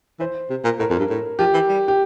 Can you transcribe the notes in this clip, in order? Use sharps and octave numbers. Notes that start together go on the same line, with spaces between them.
E3 C5
C3
A#2
A2 A#4
F2
G2
A2
F3 G4
E3
G3
G4